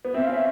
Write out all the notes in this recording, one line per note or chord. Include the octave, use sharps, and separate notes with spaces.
B3
C4 E5
C#4 F5
E5